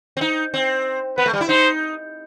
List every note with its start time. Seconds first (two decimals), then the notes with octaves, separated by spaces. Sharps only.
0.17 C4
0.21 D#4
0.54 C4
1.17 B3 B4
1.26 A3
1.33 G3
1.41 E4
1.49 D#4 C5